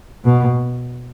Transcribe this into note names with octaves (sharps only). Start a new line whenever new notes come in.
B2